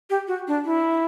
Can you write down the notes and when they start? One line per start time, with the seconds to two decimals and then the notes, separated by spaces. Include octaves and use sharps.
0.10 G4
0.28 F#4
0.48 D4
0.65 E4